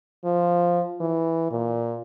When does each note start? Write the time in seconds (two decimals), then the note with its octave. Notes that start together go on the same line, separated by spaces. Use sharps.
0.25 F3
1.01 E3
1.51 A#2